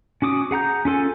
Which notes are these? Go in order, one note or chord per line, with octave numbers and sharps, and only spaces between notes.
C#4 F#4 D6 D#6
G#4 F#5 A#5 G6
C#4 F4 A4 G#5